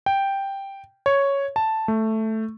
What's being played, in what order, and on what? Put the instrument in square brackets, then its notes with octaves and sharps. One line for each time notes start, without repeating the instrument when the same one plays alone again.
[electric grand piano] G5
C#5
A5
A3